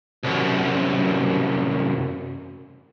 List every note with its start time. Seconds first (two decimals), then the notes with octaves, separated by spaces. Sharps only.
0.24 C2 F#2